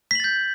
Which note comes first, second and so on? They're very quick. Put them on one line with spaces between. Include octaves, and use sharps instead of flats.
B6 F#7 A6 G6